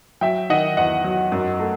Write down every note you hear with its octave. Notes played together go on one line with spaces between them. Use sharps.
F#3 E5 G5
D#3 D#5 F#5
E2 D#5 F#5
F#3
F#2
A3